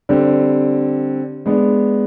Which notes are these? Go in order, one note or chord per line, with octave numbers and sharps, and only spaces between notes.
D3 G3 C4
G#3 B3 D4